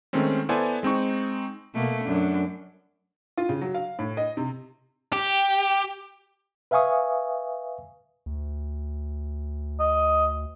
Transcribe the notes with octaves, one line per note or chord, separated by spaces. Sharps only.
D#3 G#3 A3 C4 C#4
B3 E4 A4 C5 D5 G#5
G#3 C4 D#4 C#6
B2 A3 A#3
F#2 D4
F4
C#3
F#3
F5
A2
D#5
C3
G4
B4 E5 F5 G#5 C#6 D#6
D2
D#5